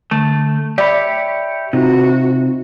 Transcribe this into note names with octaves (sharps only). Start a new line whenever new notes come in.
D3 A3
G4 C#5 D5 E5 B5
C3 C4 D#4 F4 F#4